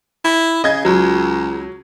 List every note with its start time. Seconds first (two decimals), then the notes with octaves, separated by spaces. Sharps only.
0.24 E4
0.64 C#3 D#5 G#6
0.85 C#2 F#3